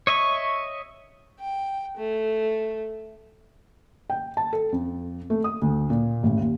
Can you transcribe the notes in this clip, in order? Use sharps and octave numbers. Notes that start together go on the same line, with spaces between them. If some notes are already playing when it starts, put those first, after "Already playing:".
C#5 D#5 E5 C#6
G5
A3
G5
A5
A4
F2
A3
D#6
D2
A#2
A1
D#2